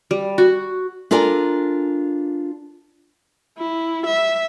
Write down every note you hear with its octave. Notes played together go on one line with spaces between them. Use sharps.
G3
F#4
D4 F4 A4 A#4 D5 G#5
E4
E5